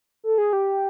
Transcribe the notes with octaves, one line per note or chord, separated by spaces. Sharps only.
A4
G#4
G4